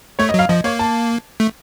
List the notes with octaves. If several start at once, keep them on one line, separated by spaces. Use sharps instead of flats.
A3 C#5
D#5
F#3 F5
F3 D#5
A#3 C#5
A5
A3